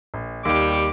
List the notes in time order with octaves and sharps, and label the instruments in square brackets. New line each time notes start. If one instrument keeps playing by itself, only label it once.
[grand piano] A#1
[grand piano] D#2 [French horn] G3 [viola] D6